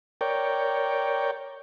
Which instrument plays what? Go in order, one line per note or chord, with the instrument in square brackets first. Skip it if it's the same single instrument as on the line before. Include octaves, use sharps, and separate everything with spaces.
[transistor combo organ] A#4 C#5 D5 G5